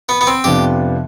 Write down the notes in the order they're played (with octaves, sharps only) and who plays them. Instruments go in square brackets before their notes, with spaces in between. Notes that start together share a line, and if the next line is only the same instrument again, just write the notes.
[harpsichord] B3
B3
C4
[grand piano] F2 C3 F3 B3 D4 [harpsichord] G4